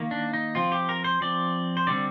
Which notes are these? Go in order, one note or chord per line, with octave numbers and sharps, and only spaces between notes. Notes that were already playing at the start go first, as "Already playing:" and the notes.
Already playing: D#3 A#3
D4
D#4
F3 C4 F4
G4
A#4
C5
F3 C4 D5
C5
D3 G3 C4 D5